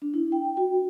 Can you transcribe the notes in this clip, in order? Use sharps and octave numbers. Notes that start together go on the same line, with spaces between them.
D4
E4
G5
F#4